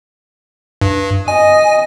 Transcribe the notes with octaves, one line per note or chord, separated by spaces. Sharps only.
G2
D#5 G#5